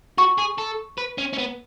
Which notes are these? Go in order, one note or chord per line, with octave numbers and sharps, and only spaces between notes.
F#4 C#6
G#4
A4
B4
C#4
C#4
B3